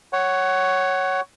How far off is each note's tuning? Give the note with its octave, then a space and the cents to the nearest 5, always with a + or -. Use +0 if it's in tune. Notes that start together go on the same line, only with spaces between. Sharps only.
C#5 +0 F#5 +20